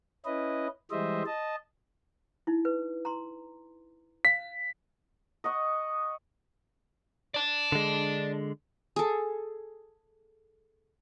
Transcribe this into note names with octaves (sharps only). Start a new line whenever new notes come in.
C#4 E4 B4 D#5
E3 G3 G#3 C5 D#5 E5
D#5 A5
D#4 E4
B4
A#5 C6
F5 B6
D#5 F#5 C#6
D5 A5
D3 G#3
G#4 A4